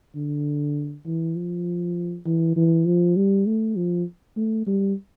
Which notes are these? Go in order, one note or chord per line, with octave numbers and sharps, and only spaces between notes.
D3
E3
F3
E3
E3
F3
G3
A3
F3
A3
G3